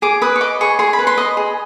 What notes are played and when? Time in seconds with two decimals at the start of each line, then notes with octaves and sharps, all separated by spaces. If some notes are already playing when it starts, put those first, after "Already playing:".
0.02 G#4 D6
0.22 B4 D#6
0.36 C#6
0.41 D#5 D6
0.61 G#4 C#6
0.79 G#4 C6
0.93 B5
0.99 B4
1.07 C6
1.18 D#5
1.37 G#4